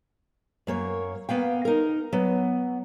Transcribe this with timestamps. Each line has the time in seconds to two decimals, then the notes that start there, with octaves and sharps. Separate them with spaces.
0.67 F#2 A#3 C#5
1.29 A#3 B3 F5 G5
1.65 D#4 A#4
2.13 F#3 B3